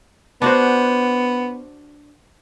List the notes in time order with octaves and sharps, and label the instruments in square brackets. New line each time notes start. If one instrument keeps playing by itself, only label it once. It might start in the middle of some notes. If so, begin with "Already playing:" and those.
[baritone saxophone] B3 [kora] D4 F#4 C5